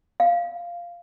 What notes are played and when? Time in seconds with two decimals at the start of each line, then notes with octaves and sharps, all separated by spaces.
0.20 F5